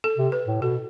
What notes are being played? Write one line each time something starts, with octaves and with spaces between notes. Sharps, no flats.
A4
C3
B4
A2
B2 A4